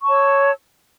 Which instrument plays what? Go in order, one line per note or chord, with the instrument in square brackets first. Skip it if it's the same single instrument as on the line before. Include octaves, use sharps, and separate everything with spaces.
[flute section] C#6
A5
C#5
E6